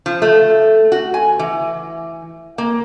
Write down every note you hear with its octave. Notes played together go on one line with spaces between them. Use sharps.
F3
A3
F#4
G#5
E3
A#3